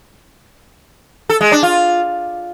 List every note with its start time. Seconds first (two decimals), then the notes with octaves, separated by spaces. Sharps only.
1.30 A4
1.41 G#3
1.52 D4
1.63 F4